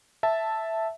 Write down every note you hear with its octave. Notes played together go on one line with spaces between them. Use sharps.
E5 A5